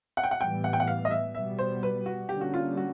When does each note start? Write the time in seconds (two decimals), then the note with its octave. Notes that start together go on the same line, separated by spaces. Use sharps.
0.17 F#5
0.24 G5
0.31 F#5
0.40 A2 E3 G3 B3 G5
0.64 F#5
0.73 G5
0.80 F#5
0.88 F5
1.05 D#5
1.11 E5
1.35 B2 G3 B3 E5
1.59 C5
1.83 B4
2.06 F#4
2.29 D3 G3 A#3 C#4 G4
2.41 F#4
2.54 F4
2.77 F#4